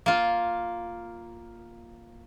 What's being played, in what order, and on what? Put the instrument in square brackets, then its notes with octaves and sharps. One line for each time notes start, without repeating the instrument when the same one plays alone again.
[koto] A#3 F4